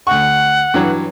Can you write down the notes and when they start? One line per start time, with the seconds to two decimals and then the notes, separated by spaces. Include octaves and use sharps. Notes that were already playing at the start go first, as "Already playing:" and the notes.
0.07 D2 F#5 C#6
0.74 G2 E3 F#3